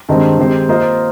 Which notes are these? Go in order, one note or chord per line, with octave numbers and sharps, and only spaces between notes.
G2 D#3 G#3 C4
D#3 G#3 C4 G4 C5
A#3 F4 C5 D#5